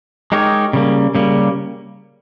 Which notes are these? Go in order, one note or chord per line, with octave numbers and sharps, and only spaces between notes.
G#3 D#4 G4 A#4 C#5
C#3 G3 A#3
C#3 G3 A#3